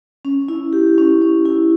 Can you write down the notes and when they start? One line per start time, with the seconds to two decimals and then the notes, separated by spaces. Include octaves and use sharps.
0.25 C#4
0.48 E4
0.73 G4
0.98 C#4
1.22 C#4
1.45 E4